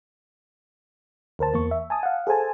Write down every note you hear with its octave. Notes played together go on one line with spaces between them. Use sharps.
D2 A#4 C5 A5
E2 A#3 C#6
E5
G#5 A5 D#6
F5 F#5
G#4 A4 C5 G#5 A5